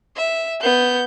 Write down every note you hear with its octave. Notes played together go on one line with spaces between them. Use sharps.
E5
B3 G6